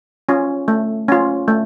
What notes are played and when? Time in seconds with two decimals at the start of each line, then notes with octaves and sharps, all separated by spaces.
0.29 C#4 F4
0.68 A3
1.08 C#4 F4
1.48 A3